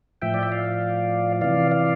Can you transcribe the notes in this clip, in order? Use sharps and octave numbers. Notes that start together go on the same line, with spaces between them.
A2 F3 E5 G5
D5
E5
D5 F5
C3 E3 D5 F5
D5 F5